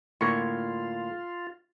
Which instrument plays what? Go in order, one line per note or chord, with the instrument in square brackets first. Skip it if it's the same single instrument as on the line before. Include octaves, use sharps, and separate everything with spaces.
[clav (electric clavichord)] A2 D3 A#3 [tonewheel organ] F4 [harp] C#6 G#6